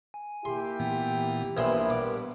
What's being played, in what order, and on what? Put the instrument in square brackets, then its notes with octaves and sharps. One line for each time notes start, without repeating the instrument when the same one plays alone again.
[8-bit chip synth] G#5
[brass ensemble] A#3 E4 G4 [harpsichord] C6
[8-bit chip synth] A#2 E3 B3
[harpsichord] A#1 E3 C6 [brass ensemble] G2 G3 B3 [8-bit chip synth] A#4
[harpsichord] D6